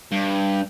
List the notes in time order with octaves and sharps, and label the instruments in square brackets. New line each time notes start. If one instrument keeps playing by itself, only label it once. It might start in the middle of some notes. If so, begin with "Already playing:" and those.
[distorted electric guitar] G2